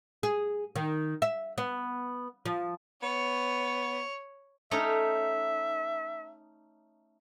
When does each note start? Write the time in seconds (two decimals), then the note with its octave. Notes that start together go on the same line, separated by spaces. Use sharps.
0.23 G#4
0.76 D#3
1.22 E5
1.58 B3
2.46 F3
3.02 B3 C#5
4.71 A3 C#4 D#4 E5